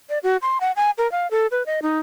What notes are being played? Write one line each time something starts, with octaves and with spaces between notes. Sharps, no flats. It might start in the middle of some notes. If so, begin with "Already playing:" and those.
D5
F#4
C6
F#5
G#5
A#4
F5
A4
B4
D#5
D#4